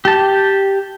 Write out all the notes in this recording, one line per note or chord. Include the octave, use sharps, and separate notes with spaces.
G4 A5